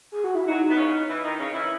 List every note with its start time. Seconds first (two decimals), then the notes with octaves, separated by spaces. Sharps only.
0.12 G#4
0.24 F#4
0.35 E4
0.48 F#3 D#4 F#4
0.69 B3
0.77 C#3 C#4
1.08 E3 E4
1.24 D#3 D#4
1.38 C#3 C#4
1.54 E3 E4